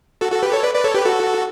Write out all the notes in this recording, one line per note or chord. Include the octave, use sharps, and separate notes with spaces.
F#4 A4
F#4 A4
G4 B4
A4 C#5
B4 D5
B4 D5
A4 C#5
G4 B4
F#4 A4